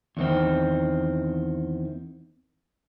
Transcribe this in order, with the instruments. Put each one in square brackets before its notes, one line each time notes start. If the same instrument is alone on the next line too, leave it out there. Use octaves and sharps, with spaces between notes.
[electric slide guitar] E2 D#3 C4